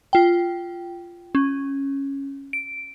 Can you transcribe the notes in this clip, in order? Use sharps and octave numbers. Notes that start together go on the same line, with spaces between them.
F4 G5
C#4
D7